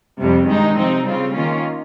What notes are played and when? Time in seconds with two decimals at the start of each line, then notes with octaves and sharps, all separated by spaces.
0.20 F2 C3 G3
0.48 G2 D#3 G#3 D#4
0.78 C3 F3 C4 D#4
1.06 C#3 G3 C4 F4
1.35 D#3 A#3 C#4 F4